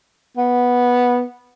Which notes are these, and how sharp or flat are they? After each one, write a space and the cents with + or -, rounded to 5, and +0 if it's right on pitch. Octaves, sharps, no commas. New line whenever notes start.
B3 -10